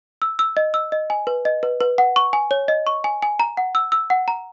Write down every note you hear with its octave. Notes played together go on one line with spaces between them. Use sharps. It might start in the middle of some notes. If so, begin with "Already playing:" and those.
E6
E6
D#5
E6
D#5
G#5
B4
D#5
B4
B4
F#5
C#6
G#5
C#5
D#5
C#6
G#5
G#5
A#5
F#5
E6
E6
F#5
A#5